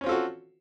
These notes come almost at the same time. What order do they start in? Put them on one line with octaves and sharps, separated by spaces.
C#4 C4 F4 A4 F#4